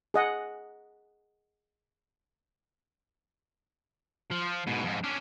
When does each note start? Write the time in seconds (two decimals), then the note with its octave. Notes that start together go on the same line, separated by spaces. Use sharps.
0.14 G#4 D#5 F#5
4.31 F3
4.67 G#2 B2
4.84 F2 G#2
5.04 C#4 D4